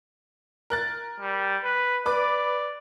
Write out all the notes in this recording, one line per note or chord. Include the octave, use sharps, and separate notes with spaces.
A#4 F#6 A6
G3
B4
B4 D5 D6